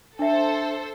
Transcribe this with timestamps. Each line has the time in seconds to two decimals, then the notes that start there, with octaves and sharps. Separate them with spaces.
0.19 D4 A4 C5 E5